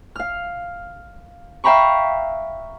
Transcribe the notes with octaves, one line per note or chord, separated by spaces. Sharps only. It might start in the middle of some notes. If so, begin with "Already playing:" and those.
F5 F6
E5 F5 G5 A#5 B5 C#6